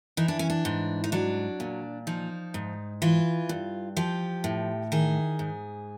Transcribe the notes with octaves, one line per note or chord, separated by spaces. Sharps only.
E3 D#4
D4
C#4
D4
G#2
D#4
F#3 D4
A#2
F3 D#4
G#2
E3 F4
G2
F3 G4
A2
D#3 G#4
G#2